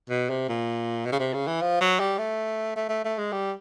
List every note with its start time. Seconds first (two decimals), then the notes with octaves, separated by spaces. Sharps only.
0.10 B2
0.29 C3
0.48 A#2
1.05 B2
1.12 C#3
1.19 C3
1.34 C#3
1.48 E3
1.62 F3
1.80 F#3
1.99 G3
2.18 A3
2.76 A3
2.89 A3
3.04 A3
3.18 G#3
3.32 G3